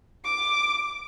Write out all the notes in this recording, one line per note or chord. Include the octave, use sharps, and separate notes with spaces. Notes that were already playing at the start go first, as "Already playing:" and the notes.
D6